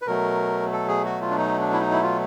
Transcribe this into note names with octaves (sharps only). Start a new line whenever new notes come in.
B4
B2 F#3 A3 A#4
A4
G#4
F#4
F4
D4
D#4
D4
E4
D#4
E4
F4